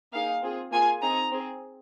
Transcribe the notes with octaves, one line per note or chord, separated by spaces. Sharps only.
A#3 D#4 G#4 F5
C4 F4 G#4
A#3 F4 G#4 G#5
C4 D#4 G#4 A#5
C4 G#4